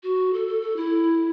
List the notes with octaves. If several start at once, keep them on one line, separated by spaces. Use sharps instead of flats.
F#4
A4
A4
A4
E4